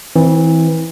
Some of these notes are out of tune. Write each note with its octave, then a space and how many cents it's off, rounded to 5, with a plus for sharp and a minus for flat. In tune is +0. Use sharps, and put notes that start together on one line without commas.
E3 -20 C4 +0